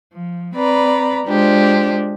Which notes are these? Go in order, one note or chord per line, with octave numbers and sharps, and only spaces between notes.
F3
C4 B4 D5 A#5 B5
G#3 D4 F4 G4 C5